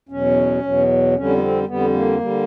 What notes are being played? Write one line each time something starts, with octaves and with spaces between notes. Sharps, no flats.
E2 B2 F#3 C#4
E2 B2 F#3
F2 D3 G3 C#4
B3
C4
F2 D3 G3 B3
A#3
D3 G3